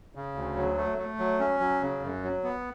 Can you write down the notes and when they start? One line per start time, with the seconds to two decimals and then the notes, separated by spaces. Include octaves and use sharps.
0.15 C#3
0.35 D2
0.57 F#3
0.77 A3
0.98 A3
1.19 F#3
1.39 C#4
1.60 F#3
1.82 C#3
2.03 F#2
2.23 F#3
2.44 B3